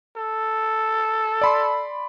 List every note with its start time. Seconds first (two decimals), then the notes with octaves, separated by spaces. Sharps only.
0.16 A4
1.41 D5 B5 C6